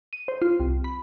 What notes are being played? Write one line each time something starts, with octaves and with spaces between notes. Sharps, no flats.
D#7
C5
F4
C2
B5